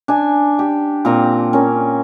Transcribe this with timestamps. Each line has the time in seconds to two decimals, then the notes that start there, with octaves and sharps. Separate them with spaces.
0.08 D4 G#5
0.59 G4
1.05 A#2 C4 A#5
1.53 C#4 A#4